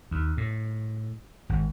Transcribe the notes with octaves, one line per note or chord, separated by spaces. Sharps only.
D#2
A2
G#1